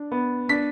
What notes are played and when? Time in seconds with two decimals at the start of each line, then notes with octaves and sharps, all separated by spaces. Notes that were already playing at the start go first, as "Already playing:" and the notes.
Already playing: D4
0.11 B3
0.49 D4 B6